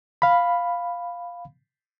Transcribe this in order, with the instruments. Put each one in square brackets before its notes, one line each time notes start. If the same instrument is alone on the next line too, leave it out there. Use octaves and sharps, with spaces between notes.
[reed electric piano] F5 B5